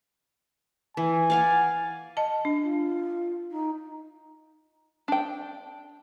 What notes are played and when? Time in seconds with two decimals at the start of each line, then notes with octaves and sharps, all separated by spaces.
0.97 E3 G#5
1.30 D5 F5 F#5
2.17 D#5 A5
2.45 D4
2.63 F4
3.51 D#4
5.08 D4 G5